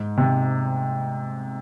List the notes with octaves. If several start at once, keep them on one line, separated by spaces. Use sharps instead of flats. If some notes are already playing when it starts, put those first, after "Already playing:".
Already playing: G#2
C3